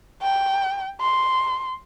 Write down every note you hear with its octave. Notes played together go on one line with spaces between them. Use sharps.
G5
C6